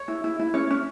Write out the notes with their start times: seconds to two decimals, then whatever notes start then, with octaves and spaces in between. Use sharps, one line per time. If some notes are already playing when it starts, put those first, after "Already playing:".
Already playing: C#5
0.08 E4
0.24 E4
0.39 E4
0.54 C#4 C#5
0.70 C#4